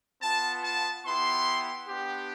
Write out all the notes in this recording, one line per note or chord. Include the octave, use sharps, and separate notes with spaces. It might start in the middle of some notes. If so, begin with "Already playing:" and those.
B3 F4 A5
A5
B3 E4 G4 C6
B3 D4 G4